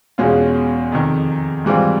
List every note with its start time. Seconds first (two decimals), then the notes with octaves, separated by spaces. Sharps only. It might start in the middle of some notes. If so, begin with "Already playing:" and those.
0.18 E2 B2 G#3 C#4 F4
0.92 F2 C3 D#3
1.65 G#2 E3 G3 C4 F4